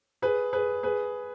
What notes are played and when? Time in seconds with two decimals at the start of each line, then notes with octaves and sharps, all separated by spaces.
0.22 G#4 B4
0.53 G#4 B4
0.83 G#4 B4